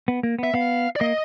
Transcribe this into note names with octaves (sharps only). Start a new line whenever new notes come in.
B3
A#3
B3
E5
B3 F5
D5
A#3 D#5